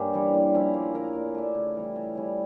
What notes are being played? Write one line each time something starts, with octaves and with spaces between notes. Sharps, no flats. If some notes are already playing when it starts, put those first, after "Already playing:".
Already playing: G2 A#3 C#4 G4
E3 G3
A#2
F3 C#4 E4
A#3
C#4 E4 A#4
A#2
A3 D4
C#3
E3 G3 C#4
C#3
G3 C#4 E4